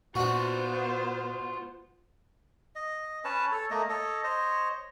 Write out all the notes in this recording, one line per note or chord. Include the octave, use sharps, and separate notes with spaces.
A#2 B3 D4 F4 F#4 C5 F#5
D#5
C#4 B4 C#5 A5
A4 C#5
A3 A#3 D#5
A4 C#5 D#5
C5 C#5 D#5